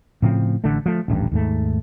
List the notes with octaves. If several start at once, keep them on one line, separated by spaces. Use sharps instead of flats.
A2 C#3 F3 C4
A1 D3 A3
F3 A3
D#1 A1 G2
D#2 G#2 A3